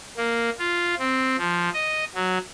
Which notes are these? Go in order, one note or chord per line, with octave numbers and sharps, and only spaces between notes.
A#3
F4
C4
F3
D#5
F#3